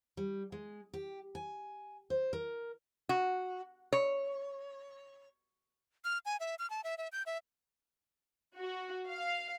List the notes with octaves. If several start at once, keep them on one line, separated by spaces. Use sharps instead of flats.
G3
G#3
G4
G#5
C5
A#4
F#4
C#5
F6
G#5
E5
F6
A5
E5
E5
G6
E5
F#4
F5